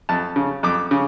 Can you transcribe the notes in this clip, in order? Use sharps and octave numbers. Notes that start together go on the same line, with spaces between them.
F2 A5
C#3
F2 D6
C#3